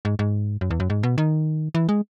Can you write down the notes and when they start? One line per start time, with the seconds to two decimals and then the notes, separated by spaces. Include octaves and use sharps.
0.05 G#2
0.19 G#2
0.61 F#2
0.71 E2
0.80 F#2
0.90 G#2
1.03 B2
1.18 D#3
1.75 E3
1.89 G#3